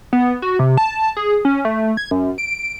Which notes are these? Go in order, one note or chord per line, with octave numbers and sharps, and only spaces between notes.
B3
F#4
C3
A5
G#4
C#4
A3
G#6
F#2
D7